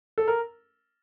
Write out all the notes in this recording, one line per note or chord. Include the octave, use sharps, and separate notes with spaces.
A4
A#4